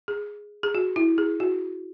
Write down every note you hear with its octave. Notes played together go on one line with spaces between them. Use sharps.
G#4
G#4
F#4
E4
G#4
F#4